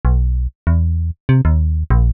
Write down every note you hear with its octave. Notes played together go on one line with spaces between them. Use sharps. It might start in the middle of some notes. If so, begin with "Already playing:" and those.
B1
E2
C3
D#2
A#1